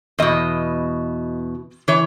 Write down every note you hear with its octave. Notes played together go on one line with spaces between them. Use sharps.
E2 B2 D#5
E3 C#5